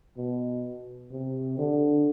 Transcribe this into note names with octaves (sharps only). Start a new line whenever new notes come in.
B2
C3
D3